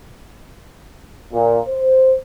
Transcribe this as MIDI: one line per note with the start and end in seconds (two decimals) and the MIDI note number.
1.33 1.59 46
1.68 2.14 72